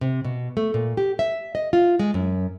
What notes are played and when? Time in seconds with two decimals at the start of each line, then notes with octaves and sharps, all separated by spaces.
0.01 C3
0.24 B2
0.57 A3
0.74 A#2
0.97 G4
1.19 E5
1.55 D#5
1.73 F4
1.99 G#3
2.14 F#2